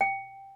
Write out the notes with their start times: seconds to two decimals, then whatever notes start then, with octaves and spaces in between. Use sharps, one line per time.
0.01 G5